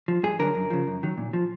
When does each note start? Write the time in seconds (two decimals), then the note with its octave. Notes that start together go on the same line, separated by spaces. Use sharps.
0.08 F3
0.23 G2 G#4
0.39 D3 F#3 A#4
0.55 F#2
0.70 C#3 F3
0.87 F#2
1.03 D#3 F#3
1.18 A#2
1.33 F3